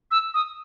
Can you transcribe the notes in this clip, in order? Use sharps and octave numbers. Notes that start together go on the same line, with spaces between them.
E6
D#6